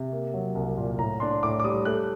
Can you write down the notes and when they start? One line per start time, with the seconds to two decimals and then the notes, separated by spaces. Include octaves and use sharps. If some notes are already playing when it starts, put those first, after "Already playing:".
Already playing: C3
0.12 A#3
0.34 F#3
0.55 C2
0.77 A#2
0.98 A2 A#5
1.20 D4 C6
1.43 A2 D6
1.60 D6
1.64 G3 D#6
1.85 A3 F#6